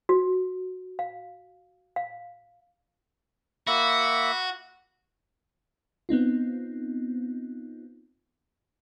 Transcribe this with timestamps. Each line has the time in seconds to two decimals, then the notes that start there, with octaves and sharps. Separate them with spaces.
0.09 F#4
0.99 F5
1.96 F5
3.67 A#3 F#4 E5 B5
6.09 B3 C4 D#4 F4